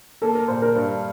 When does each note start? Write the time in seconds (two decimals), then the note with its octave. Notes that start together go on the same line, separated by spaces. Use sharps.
0.22 A#3 A4
0.35 A#4
0.48 A#2 C5
0.62 A#4
0.75 G2 C5